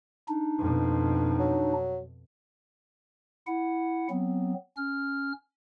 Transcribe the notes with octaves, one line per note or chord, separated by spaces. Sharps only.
D4 D#4
F2 B2
F#3
E4 F#5
F#3 B3 C4
C#4 F6